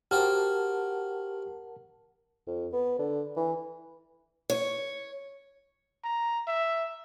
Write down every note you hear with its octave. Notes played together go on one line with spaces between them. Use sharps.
F#4 G4 A#4 C5 F#5 G5 A5 F6
F2
B3
D3
E3
C#5
A#5
E5